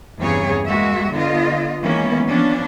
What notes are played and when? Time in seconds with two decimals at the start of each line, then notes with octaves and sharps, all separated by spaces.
0.19 E2 G2 C#3 C4 G#4 C#5
0.67 G#3 A#3 F#4 E5
1.13 D3 B3 F4 D#5
1.83 D#3 E3 G#3 A#3 B3 C#4
2.29 F3 B3 C#4 D4